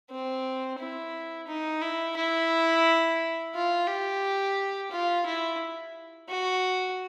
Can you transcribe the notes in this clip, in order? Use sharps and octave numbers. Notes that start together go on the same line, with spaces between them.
C4
E4
D#4
E4
E4
F4
G4
F4
E4
F#4